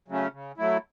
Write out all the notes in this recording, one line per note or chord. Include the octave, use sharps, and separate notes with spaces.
C#3 F#3 A3 C#4
C#3
F#3 A3 E4